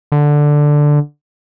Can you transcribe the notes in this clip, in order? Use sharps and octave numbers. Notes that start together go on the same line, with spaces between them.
D3